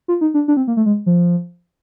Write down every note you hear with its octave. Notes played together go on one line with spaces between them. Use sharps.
F4
D#4
D4
D4
C4
A#3
A3
G#3
F3